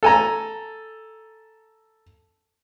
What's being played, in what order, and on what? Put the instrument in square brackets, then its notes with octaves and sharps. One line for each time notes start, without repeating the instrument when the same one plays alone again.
[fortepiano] A4 G#5 A#5